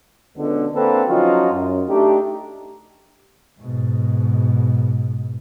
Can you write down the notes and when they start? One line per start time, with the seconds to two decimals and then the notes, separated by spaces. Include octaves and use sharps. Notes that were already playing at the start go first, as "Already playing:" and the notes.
0.37 C#2 B2 D3
0.74 D3 A#3 C4 A4 B4
1.08 F3 F#3 C#4 D#4 F4 F#4
1.52 F#2
1.88 A3 D4 D#4 G4
3.60 G#2 B2